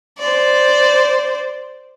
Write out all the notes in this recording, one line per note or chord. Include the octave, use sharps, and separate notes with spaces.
C5 D5